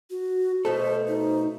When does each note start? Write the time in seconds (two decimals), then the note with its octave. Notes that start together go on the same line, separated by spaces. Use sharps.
0.10 F#4
0.65 B2 A3 A4 C5
1.08 D#4